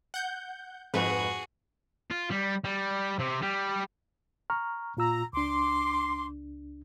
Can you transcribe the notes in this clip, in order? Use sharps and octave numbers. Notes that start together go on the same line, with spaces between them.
F#5 G6
F2 G#2 F#4 G#4 B4
F4
G3
G3
C3
G3
A#5 C#6 F6
A#2 F4 A#5 E6
C#2 D4 C6 D6